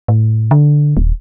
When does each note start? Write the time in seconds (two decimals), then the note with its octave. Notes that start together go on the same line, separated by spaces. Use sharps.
0.08 A2
0.51 D3
0.97 D#1